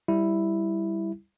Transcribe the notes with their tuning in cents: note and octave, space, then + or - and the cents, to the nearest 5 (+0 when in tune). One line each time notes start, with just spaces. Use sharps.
G3 +0 E4 +0